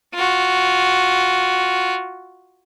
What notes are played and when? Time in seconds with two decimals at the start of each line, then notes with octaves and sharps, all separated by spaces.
0.14 F4 F#4